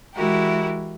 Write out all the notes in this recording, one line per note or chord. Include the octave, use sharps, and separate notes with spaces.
E3 G#3 E4 F#4 G4 A#4